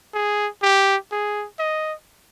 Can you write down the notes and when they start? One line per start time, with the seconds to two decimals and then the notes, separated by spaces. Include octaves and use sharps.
0.14 G#4
0.62 G4
1.12 G#4
1.59 D#5